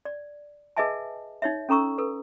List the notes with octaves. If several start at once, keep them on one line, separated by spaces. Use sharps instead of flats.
D5
G#4 B4 D#5 E5 G#5 A5
D#4 C#5 E5
C#4 A4 A#5 C#6 E6
A4 B4